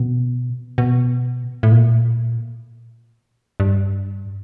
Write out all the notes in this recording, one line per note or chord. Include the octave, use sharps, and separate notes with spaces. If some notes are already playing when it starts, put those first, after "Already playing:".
Already playing: B2
B2
A2
A#2
G2